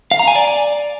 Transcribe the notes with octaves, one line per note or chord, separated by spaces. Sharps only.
F5
A#5
G#5
D5